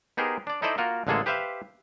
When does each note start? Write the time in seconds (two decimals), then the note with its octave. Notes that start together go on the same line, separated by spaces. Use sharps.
0.17 B3 D#4 G4 G#4 A#4 C5
0.47 D4 D5
0.62 D#4 E4 A4 C5 D5 D#5
0.78 A#3 F4 F#4 A#4
1.07 A1 D3 G#3 A#3 G#4 A4
1.26 G4 B4 C5 E5 F5